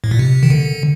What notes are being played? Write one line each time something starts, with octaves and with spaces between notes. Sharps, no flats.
A2
A#2
C3
D#3
D3